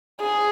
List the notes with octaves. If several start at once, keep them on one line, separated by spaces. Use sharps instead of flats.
G#4